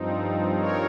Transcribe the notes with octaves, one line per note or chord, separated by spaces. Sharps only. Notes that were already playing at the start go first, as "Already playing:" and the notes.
Already playing: G2 F3 C4 D#4
A#4 C#5